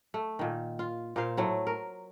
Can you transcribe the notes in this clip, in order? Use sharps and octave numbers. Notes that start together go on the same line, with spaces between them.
A3
A#2 D#3
F4
A#2 A#4 C5 F5
A2 F#3 A3
A#4